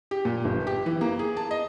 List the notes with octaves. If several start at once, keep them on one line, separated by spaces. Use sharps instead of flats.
G4
A#2
G1
G4
E3
A#3
G#4
A5
D#5